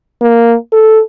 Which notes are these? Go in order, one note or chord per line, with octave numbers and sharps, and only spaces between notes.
A#3
A4